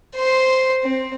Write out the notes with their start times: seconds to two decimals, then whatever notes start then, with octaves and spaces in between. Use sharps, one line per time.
0.15 C5 C6
0.83 C4